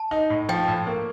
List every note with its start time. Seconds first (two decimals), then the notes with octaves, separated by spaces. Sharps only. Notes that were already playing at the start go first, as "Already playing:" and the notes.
Already playing: A5
0.11 D#4
0.30 A2
0.49 F3 G5
0.68 A2
0.87 A#3